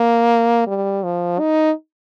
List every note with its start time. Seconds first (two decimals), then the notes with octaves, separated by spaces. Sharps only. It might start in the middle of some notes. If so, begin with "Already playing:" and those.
Already playing: A#3
0.67 G3
1.04 F3
1.40 D#4